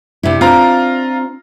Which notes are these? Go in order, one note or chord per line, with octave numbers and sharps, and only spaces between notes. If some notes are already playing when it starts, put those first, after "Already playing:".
C3 D4 E4
C4 D4 F4 A#5